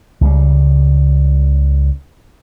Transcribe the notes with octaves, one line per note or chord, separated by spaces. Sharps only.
C#2 C#3 F#3 G3